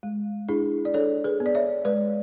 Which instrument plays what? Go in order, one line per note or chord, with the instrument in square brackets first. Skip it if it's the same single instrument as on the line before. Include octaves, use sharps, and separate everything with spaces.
[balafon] G#3
D4 E4 G#4
D5
D4 A4 C#5
G#4 B4
B3
D5
C#5 E5
G#3 B4 D5